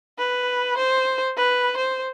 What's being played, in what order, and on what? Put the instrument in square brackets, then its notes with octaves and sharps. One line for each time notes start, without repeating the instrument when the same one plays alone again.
[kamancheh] B4
C5
B4
C5